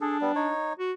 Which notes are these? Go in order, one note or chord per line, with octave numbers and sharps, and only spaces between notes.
D4 G#4 A4
G3 B3
D#4 C#5
F#4